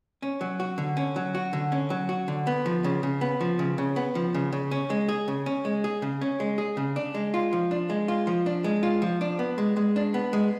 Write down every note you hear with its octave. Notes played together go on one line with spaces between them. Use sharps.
C#4
F#3
F#4
D3
C#4
F#3
F#4
D3
C#4
F#3
F#4
D3
B3
F3
C#3
C#3
B3
F3
C#3
C#3
B3
F3
C#3
C#3
C#4
G#3
G#4
C#3
C#4
G#3
G#4
C#3
C#4
G#3
G#4
C#3
D4
G#3
F4
F3
D4
G#3
F4
F3
D4
G#3
F4
F3
D4
B3
G#3
G#3
D4
B3
G#3